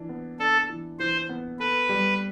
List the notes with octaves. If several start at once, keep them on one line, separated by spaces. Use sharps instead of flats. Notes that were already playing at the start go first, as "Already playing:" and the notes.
Already playing: E3 D4
B3
D4 A4
E3
E3 C5
B3
A4 B4
G3